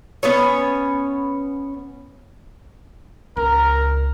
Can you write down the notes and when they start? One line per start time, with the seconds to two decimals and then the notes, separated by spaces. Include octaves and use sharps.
0.23 B3 C#4 C#5
3.37 C#2 A#4